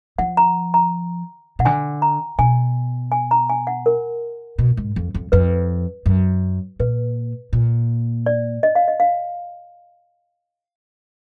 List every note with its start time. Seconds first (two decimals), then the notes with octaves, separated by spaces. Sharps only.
0.18 F3 F#5
0.37 A#5
0.74 A#5
1.59 B2 F#5
1.65 D3 G#5
2.02 A#5
2.38 B2 G#5
3.12 G#5
3.31 A#5
3.49 G#5
3.67 F#5
3.86 A#4
4.58 B2
4.77 G#2
4.96 F2
5.14 F2
5.32 F2 B4
6.06 F#2
6.80 A#2 B4
7.53 A#2
8.26 D5
8.63 D#5
8.75 F5
8.88 D#5
9.00 F5